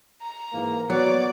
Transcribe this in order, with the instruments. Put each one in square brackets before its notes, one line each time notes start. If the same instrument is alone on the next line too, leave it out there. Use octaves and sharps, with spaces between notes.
[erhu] A#5
[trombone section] G#2 E3 A#3
[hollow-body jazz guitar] F#3 [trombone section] B3 F#4 [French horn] C#5 [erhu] D5